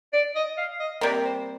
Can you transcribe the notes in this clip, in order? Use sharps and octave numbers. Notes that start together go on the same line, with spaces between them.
D5
D#5
F5
D#5
C3 G3 A#3 D5
C5